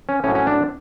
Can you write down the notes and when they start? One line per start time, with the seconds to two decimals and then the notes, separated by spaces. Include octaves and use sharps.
0.09 C#4
0.24 A2 C#4
0.28 F#3
0.35 C#4
0.47 D4